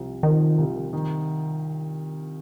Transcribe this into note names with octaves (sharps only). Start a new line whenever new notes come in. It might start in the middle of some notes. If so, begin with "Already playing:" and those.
Already playing: C2 F3
D#3 F3
C2
D#3